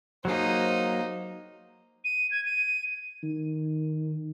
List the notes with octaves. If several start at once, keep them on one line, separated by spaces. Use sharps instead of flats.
F#3 A#3 D#4 G#4 C5
D#7
G#6
D#7
D#3